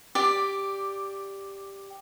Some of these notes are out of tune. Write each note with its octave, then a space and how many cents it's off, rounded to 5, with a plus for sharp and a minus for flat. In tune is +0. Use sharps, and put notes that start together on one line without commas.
G4 +5 D5 +0